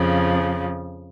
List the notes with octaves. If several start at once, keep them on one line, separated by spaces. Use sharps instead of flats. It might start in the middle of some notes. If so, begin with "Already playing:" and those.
Already playing: F2 C#3 F3